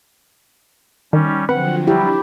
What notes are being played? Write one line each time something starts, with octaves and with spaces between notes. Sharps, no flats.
D#3 G3 C#4
D3 F3 F#3 C4 B4 F#5
F#3 G3 D4 E4 G4